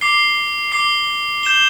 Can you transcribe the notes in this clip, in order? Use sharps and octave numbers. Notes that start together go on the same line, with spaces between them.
D6 C7 G7
D6 C7 G7
G6 E7 G7